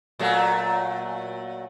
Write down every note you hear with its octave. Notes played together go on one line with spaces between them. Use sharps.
A#2 F#3 A3